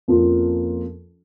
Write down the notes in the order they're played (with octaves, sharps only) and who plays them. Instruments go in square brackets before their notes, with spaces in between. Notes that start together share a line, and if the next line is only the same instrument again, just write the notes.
[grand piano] F2 F3 A#3 C#4 F4